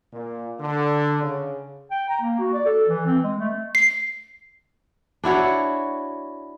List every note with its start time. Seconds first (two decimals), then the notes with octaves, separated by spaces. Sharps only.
0.13 A#2
0.60 D3
1.22 C#3
1.91 G5
2.09 A#5
2.21 A#3
2.39 F#4
2.53 D5
2.66 A4
2.88 E3
3.06 C4
3.23 G#3
3.38 A3
3.75 C7
5.24 D4 E4 F#4 C#5